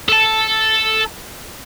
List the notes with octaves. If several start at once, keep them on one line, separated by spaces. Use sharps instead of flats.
A4 A5